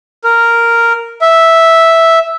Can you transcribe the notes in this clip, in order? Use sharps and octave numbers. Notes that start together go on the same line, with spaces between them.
A#4
E5